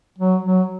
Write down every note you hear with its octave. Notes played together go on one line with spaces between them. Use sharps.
F#3
F#3